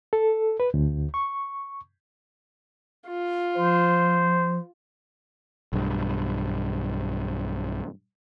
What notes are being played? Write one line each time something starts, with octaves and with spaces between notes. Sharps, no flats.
A4
B4
D2
C#6
F4
F3 C5
B1 G2